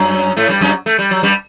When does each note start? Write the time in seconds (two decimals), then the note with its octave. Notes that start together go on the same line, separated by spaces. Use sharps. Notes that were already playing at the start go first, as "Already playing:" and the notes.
Already playing: F#2 F#3
0.37 A2 A3
0.49 G2 G3
0.61 F#2 F#3
0.86 A3
0.99 G3
1.11 F#3
1.23 G2 G3